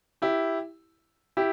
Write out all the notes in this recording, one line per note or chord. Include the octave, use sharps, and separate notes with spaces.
E4 G4
E4 G4